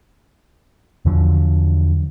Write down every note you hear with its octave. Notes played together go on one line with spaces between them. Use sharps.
E2 D3 F3 F#3